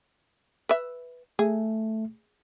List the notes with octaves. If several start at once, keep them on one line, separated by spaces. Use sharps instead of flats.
B4 E5
A3 G#4